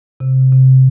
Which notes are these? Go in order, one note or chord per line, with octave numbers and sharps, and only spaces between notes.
C3
C3